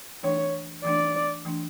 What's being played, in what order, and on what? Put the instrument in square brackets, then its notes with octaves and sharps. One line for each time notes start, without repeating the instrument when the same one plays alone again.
[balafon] E3 A3 D4 [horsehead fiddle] C#5
[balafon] E3 A3 D4 [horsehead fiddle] D5
[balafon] E3 A3 D4